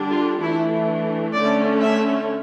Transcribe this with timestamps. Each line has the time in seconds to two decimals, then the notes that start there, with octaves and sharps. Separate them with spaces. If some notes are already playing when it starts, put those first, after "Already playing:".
Already playing: D3 G3 D4
0.11 F4
0.42 E3 A3 D4 E4
1.34 D3 A3 C#4 D5
1.81 E5